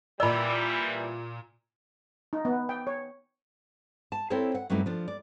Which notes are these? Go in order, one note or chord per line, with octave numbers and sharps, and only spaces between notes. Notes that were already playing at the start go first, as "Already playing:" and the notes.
A#2 E3 G3 A#4 D5 B5 E6
D#4
B3
G5
C#5
A5
C4 E4 A4 A#4 C5 C#5
F#5
G2 F#3 A3 C4 D#4 E4
F3 D4
D5